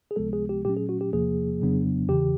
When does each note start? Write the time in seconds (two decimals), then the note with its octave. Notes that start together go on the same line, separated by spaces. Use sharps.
0.11 G#4
0.16 C#2 C3 F3 G#3 B3 A4
0.33 G#4
0.49 G4
0.65 A#2 F#3 A3 C#4 G4
0.77 G#4
0.89 F#4
1.01 G4
1.13 E2 C3 F3 A#3 G#4
1.60 F2 C#3 F#3 B3 D4
2.08 E2 C#3 E3 G4